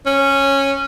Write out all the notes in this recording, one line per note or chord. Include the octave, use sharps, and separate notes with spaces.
C#4